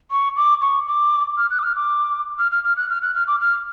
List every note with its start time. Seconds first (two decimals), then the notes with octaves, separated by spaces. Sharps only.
0.11 C#6
0.36 D6
0.62 C#6
0.87 D6
1.38 F6
1.50 F#6
1.59 D6
1.63 F6
1.76 D6
2.39 F6
2.52 F6
2.64 F6
2.77 F#6
2.90 F6
3.02 F#6
3.15 F6
3.27 D6
3.41 F6